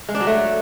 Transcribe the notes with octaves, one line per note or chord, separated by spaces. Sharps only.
G#3
D4
F#3
A3